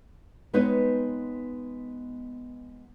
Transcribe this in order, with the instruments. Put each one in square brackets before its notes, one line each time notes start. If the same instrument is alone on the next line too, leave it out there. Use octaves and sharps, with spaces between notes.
[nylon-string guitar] G#3 B3 C4 D#4 B4 C#5